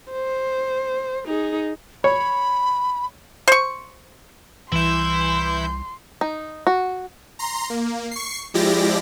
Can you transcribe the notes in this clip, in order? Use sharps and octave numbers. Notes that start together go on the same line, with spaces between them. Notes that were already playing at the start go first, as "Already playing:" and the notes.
C5
D#4 G#4
C#5 B5
C5 C#6
C2 E3 E4 E5 C6 G6
D#4
F#4
A#5 C6
A#3
C#6 C7
F3 G#3 E4 G4 D5 A#6